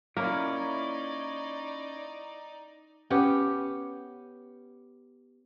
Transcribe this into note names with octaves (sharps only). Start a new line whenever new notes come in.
A#3 C#4 D#4 E4 D5
B3 C#4 G4 C#5